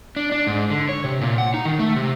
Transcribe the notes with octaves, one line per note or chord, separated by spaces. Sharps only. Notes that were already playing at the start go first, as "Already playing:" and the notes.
D4
D4
G#2
D3
C#5
C3
A#2
F#5
D#4
D#3
A3
C3